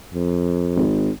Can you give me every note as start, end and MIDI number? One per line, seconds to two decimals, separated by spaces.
0.14 0.85 41
0.76 1.10 32